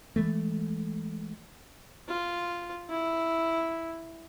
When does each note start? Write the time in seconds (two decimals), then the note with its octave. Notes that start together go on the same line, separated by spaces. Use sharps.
0.16 E3 G#3 A3
2.08 F4
2.90 E4